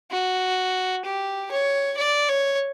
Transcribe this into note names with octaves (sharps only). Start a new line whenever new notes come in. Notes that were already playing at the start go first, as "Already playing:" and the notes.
F#4
G4
C#5
D5
C#5